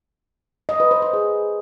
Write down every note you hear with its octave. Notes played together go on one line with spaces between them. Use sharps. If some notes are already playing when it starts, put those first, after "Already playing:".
D#5
B4
C5
C5
G#4